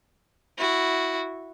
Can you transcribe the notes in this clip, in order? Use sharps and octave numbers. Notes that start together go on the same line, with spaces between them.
E4 F#4